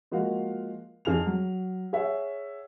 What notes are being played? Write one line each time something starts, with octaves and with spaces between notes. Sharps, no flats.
F3 G#3 A#3 F#4 F5
F2 G#4 F6 F7
F#3
G#4 C#5 E5 F#5